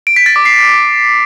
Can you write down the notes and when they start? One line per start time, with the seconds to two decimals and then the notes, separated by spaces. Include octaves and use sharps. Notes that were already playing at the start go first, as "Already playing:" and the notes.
0.07 D7
0.16 B6
0.26 A6
0.36 D6
0.45 C7